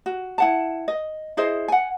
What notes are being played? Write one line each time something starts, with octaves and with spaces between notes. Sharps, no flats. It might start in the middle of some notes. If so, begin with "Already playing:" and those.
F#4
E4 F#5 A5
D#5
E4 G#4 C5 D#5
F#5 G#5